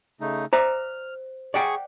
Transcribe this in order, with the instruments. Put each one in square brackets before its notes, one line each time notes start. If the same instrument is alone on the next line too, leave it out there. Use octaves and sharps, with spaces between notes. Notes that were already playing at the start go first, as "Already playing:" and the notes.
[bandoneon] C#3 A3 D#4
[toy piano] C5 [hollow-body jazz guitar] D5 E5 A#5 [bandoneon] F6
[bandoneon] G#4 C#6 [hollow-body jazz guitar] D5 F#5 G5